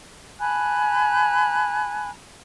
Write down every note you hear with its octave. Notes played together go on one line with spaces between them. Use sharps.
G#5 A5 B5 F#6